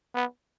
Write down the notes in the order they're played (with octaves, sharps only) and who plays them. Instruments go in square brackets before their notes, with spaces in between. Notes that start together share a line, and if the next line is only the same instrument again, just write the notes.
[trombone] B3